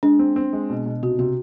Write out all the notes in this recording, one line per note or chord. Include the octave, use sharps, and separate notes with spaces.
G#3 D4
C4
C4
G#3
B2
B2
C3 F#4
C3 F#4